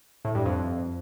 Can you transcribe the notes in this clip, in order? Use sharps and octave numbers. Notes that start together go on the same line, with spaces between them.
A2
G2
F2